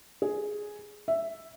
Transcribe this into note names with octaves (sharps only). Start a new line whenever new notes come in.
G#4
E5